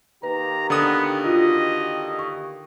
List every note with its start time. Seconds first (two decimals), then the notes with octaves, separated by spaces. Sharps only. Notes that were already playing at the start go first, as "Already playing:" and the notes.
0.23 D#3 A#3 G4 B4 A#5
0.70 D3 B3 D#6
1.25 F4 F#4 D#5
2.19 C#6